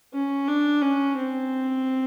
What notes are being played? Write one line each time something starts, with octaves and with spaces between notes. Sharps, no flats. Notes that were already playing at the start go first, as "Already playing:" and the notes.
C#4
D4
C#4
C4